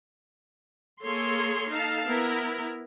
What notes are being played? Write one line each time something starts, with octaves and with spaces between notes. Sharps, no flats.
A#3 G#4 A4 C#5 C6
D#4 A4 F5 A5
B3 E4 A#4